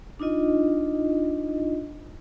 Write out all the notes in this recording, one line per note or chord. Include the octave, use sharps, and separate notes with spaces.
D4 D#4 F4 D#5